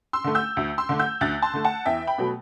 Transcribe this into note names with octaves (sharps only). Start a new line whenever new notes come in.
C6 E6
D3 A3
E6 G6
D2
C6 E6
D3 A3
E6 G6
D2 F#6 A6
A5 C6
D3 A3
F#5 A5
E2 E5 G5
G5 B5
B2 F#3 A3